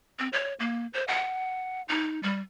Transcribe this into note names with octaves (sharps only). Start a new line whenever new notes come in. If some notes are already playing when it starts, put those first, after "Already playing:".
C4
C#5
A#3
C5
F#5
D#4
G3